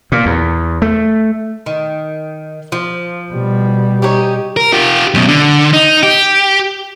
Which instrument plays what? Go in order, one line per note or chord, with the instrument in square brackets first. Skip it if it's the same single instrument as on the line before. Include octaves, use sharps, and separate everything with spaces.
[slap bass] A#2
E2
A3
[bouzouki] D#3
F3
[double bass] B2 G3
[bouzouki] C#4 D#4 G4
[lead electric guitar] A#4
F4 G4
F#2 B2
D3
D#4
G4